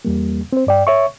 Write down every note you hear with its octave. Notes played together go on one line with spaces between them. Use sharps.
E2 G3 A#3
C4 C5
G2 D5 G5
C#5 E5 C#6